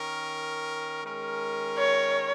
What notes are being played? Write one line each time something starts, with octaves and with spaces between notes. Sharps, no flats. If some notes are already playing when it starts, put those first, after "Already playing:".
Already playing: D#3 C#4 A#4
D#3 G#3 C#4 A#4
C#5